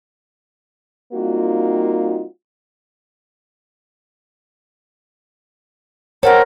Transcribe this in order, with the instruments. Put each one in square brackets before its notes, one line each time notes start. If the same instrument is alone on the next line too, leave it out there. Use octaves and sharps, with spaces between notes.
[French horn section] G3 A#3 C4 D#4 F4 F#4
[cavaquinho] A4 F#5 G5 [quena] A#4 [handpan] C5 C#5